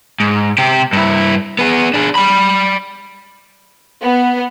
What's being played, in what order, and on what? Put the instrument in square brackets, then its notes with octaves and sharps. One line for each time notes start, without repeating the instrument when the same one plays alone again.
[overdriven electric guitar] G#2
C3 G4
G2 E4
B3 G#4
D4 G#4
D5 B5
[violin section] B3